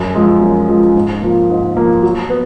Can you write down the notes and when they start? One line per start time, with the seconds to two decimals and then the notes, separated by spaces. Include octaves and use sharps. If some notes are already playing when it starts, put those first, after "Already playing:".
Already playing: F#2
0.15 F3 G#3
0.41 F#2
0.68 F3 G#3
0.95 G#2
1.22 F3 A#3
1.50 G#2
1.77 F3 A#3
2.02 F#3
2.29 B3